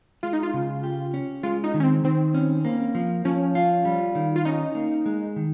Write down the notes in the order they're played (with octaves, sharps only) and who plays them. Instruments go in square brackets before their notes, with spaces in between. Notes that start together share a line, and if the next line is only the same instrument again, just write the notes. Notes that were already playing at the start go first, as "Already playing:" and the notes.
[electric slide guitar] G#3 [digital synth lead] F4
[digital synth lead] D#4
F4
[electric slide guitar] C#3
G4
C#4
[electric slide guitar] G#3 [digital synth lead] F4
[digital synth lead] D#4
[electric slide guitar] D#3
[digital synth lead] C#4
C4
[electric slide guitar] D#3 [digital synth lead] C4
[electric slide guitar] C#4
A#3
F3
[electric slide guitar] F3 [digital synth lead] C#4
[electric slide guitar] F4
G3
D#3
[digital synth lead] F4
[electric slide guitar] C#4 [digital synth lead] D#4
[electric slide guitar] A#3
G#3
D#3